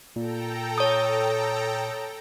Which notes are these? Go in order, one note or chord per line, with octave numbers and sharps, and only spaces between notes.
A#2 A4 G5 A#5
C#5 D#6